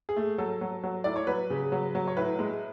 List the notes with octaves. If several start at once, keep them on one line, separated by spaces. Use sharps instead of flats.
G#4
A3
F#3 A4
F#3
F#3
A2 D5
C#5
F#3 B4
C#3
F#3
F#3
C#5
A2 B4
G#3